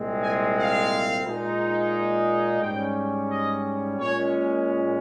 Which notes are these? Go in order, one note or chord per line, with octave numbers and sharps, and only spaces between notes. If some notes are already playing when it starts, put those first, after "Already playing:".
Already playing: C2 A#2 G#3 C4
G#5
F5
A#2 G#3 D#4
G#2 G3 C#4 G5
D#5
A#2 G#3 C#4 C#5